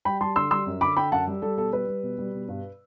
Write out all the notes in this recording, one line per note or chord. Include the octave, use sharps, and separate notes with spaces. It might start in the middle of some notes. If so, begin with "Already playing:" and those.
G3 G5 B5
G3 A5 C6
D3 C6 E6
G3 C6 E6
F#2
D3 B5 D6
D3 G5 B5
F#2 F#5 A5
G3
G3 A4
B2 A4
G3 B4
G3
B2
G3
B2
G2